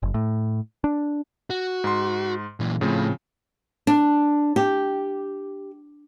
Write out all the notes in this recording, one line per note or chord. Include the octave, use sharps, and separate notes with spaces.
F#1
A2
D4
F#4
G#2 C6
A#2 E3
A2 C#3 F3 A3 C4
D4
G4